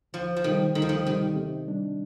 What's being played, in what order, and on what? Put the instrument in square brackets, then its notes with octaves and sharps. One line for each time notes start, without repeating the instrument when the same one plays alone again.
[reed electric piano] D2 [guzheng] F3
[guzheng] F3
[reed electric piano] C3 G3 [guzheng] D#3
[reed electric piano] D2 [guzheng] D#3
[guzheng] F3
D#3
[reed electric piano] C3 G3 [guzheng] D#3
[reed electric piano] C3
G3 D4